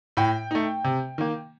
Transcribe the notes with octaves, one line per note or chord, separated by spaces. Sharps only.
A2 G5
A3 D#4
C3
D#3 A#3